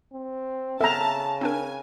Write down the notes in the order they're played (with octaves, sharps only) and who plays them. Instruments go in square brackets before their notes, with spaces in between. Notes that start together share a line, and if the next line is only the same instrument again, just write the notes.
[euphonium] C4
[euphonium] C#3 [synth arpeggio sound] B3 A4 [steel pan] E5 A#5 [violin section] A5
[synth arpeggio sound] C4 D4 A#4 [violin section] G#5